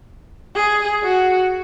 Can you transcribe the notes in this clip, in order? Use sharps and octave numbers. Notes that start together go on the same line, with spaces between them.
G#4
F#4